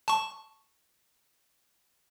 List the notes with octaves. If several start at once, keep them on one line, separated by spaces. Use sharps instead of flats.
A5 C#6